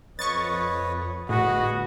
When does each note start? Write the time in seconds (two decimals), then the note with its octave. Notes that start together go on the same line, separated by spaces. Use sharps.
0.19 F2 B4 C#5 D#5 C#6 A6
1.29 G1 A2 F#4 G#4 B4 D#5